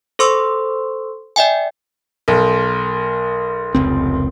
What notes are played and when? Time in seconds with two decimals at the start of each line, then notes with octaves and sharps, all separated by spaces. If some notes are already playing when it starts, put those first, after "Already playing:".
0.19 A4 C5 C6 C#6 E6
1.36 D5 E5 G5 G#5
2.28 B1 A#4 C6
3.75 F1 C#2 C4